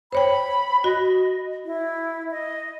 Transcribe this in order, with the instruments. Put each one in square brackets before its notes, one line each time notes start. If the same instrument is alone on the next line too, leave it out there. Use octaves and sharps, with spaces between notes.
[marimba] C5 C#5 G5 [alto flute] B5
[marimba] F#4 [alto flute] D#5
[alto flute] E4
D#5